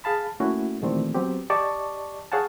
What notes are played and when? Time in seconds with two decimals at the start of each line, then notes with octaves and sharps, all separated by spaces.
0.04 G#4 F5 A5 B5
0.40 A3 A#3 C#4 E4 F#4
0.82 A#2 D#3 E3 G3 A3 C4
1.14 F#3 B3 C4 G4
1.50 G4 D5 D#5 A5 C#6
2.32 G#4 C#5 F5 F#5 G#5 A5